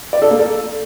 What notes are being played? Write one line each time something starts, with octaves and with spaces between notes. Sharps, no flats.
D5
A4
A#3
A4